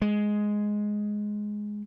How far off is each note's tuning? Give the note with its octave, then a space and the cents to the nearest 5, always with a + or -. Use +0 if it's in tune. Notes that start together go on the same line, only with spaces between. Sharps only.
G#3 +5